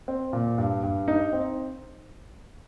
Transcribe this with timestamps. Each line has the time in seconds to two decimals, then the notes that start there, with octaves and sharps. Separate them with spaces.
0.08 C4
0.33 A#2
0.58 G2
0.83 G2
1.08 D#4
1.33 C4